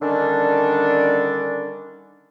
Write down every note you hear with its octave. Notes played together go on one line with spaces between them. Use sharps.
D3 D#3 G3 C#4 D4